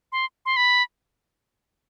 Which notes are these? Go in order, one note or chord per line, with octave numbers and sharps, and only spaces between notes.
C6
C6
B5